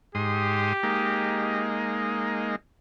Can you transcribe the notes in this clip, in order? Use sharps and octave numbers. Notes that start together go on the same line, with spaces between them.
G#2 G4 C6 D#6
G#3 A#3 D#4